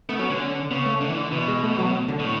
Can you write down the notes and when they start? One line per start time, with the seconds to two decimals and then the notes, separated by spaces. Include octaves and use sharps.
0.09 A3 B3
0.19 F#3 C#4
0.30 D3 C#4
0.40 C#4
0.71 C#3 B3
0.86 A3
1.02 D3
1.09 E3
1.17 D3
1.32 B2 E3
1.48 G#3
1.63 A3
1.78 F#3
2.08 D3
2.20 B2
2.25 A2